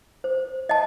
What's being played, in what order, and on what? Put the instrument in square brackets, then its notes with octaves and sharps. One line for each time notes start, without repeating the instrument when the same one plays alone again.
[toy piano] C5
D#5 A5